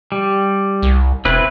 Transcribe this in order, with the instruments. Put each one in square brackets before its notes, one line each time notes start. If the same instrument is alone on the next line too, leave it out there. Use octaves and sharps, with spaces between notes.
[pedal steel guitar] G3
[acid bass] C2
[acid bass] E1 [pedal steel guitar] C4 E4 B4